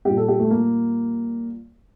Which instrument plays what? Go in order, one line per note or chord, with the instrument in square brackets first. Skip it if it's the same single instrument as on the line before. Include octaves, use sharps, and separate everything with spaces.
[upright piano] A#2 G3 G4
A4
G4
A3
A#3